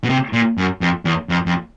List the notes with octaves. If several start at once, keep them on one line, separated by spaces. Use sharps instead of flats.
B2
C3
A#2
F#2
F2
E2
F2
F2